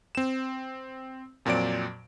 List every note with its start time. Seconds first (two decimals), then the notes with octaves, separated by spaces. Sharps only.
0.15 C4 E7
1.45 F2 A#2 F#3 C4 D5 D7